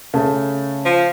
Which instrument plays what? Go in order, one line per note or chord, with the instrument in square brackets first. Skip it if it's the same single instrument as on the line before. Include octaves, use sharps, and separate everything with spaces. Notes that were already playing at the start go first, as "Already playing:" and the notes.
[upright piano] C#3 A3 A5
[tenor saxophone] F3